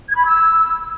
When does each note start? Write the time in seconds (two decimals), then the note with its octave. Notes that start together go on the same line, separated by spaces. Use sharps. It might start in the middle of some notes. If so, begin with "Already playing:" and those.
0.08 G#6
0.17 B5
0.26 E6